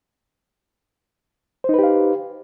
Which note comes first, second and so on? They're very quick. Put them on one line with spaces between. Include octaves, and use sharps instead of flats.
C5 D#4 B4 G4 F5